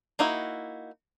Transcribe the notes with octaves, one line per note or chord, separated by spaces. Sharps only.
A#3 D#4 E4 F#4